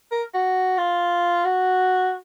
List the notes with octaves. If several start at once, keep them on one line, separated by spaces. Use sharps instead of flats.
A#4
F#4
F4
F#4